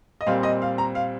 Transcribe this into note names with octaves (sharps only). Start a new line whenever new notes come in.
D#5
A#2 G3 C4 F5
D#5
F5
A#5
F5